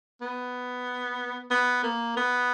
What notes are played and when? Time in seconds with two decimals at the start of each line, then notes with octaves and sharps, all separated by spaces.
0.22 B3
1.51 B3
1.83 A#3
2.17 B3